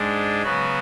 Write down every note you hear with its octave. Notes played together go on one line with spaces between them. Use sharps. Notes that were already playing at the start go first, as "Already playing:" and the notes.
Already playing: G#2 G#3 D4
C#3 F#3 B3 F#4